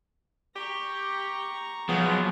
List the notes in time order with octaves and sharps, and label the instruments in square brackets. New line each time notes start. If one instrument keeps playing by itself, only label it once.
[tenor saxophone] G4 [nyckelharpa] A#5 C#6
[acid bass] F3 [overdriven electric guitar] F#3 B3 [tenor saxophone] G#4